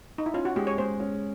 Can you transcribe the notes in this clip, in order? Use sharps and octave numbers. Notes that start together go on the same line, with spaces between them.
D#4
E4
C#4 F4
F#4
G#3 G4
C#5
G#3 C5
C#4